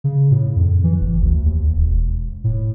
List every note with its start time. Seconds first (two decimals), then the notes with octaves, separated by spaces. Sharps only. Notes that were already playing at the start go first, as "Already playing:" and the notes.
0.04 C#3
0.31 A2
0.56 F2
0.84 E3
1.01 F#1
1.22 D2
1.45 D#2
1.76 E1
2.44 A2